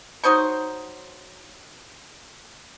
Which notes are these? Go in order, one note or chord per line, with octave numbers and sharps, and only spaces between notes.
F#3 D#4 C5 C#6